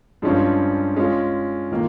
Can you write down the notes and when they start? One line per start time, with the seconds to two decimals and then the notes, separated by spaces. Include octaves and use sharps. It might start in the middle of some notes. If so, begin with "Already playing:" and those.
0.22 G2 F3 G#3 C#4 F4
0.96 G#3 C#4 F4
1.71 D#3 A#3 F4